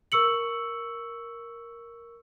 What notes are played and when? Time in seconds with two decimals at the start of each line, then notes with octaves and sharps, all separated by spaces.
0.12 A#4 C#6 E6 C#7 F#7